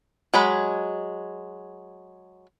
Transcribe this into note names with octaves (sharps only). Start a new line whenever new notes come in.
F#3 G#3 B5